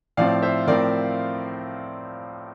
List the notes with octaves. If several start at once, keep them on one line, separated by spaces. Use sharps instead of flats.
A2 F3 C4 D5 F5
C5 E5
A2 F3 C4 A#4 D5